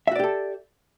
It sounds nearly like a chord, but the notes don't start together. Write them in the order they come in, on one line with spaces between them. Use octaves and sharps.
E5 F#4 D5 G4 A4